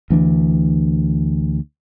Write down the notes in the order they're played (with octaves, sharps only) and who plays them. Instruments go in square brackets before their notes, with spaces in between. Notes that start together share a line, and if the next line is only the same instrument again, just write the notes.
[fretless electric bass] D2 E3 D4